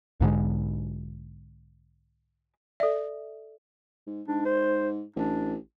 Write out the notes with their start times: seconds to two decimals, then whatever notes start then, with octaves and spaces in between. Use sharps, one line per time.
0.20 B1 G#2 D3 G#3
2.80 A4 D5 E5
4.07 G#2
4.28 G#2 D4
4.45 C5
5.16 A1 D4